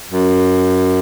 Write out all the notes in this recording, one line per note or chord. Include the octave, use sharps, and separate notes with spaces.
F#2